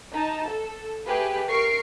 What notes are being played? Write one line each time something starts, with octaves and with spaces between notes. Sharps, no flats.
D#4 A5
A4
A3 G4 G#4 B4
A#4 C#6 C7 D7